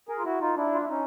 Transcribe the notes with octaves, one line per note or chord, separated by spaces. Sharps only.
G#4 A#4
F4
E4 F#4
D#4 F4
D4 E4
F4
E4
C#4 D#4